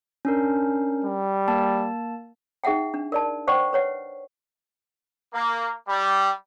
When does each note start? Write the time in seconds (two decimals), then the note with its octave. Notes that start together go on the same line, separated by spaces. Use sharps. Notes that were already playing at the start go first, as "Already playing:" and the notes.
0.25 C#4 D4 A#4
1.05 G3
1.48 A#3 A5
2.64 D#4 G#4 E5 F#5 G5
2.94 D4
3.12 A#4 D5 A5
3.47 C5 D5 F#5 G5 C#6
3.73 B4 C#5 F#5
5.34 A#3
5.88 G3